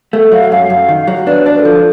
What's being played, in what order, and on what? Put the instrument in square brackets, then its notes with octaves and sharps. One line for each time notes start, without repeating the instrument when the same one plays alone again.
[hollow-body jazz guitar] A3 [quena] E5
[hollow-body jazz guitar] F#3 [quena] F5
[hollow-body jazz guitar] F#2 [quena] F5
[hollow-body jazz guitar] F#2
D#3
F#3
[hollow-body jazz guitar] D4 [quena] B4
[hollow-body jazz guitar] D4
[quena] B4
A4
[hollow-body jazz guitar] F3